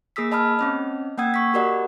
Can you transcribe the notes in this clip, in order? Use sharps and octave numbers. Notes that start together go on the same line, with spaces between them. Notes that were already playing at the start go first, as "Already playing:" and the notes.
A#3 G#4 D#6 E6 B6
D#5 A5 B5 D#6 F6
C4 C#4 D#5
A#3 F#5 G5 D#6 E6 G#6
C#6 B6
F#4 G4 A#4 D5 D#5 F#5